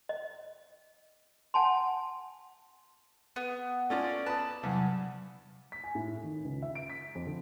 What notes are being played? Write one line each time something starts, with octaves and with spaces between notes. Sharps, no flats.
D#5
F#5 G#5 A5 C6
B3
A3 C#4 F4 D5
B4 A5 B5 D#6
E2 G2 C3 F#3 F#5
B6
G#5
A2
D#3
C#2
E5
D7
B6
F2
D3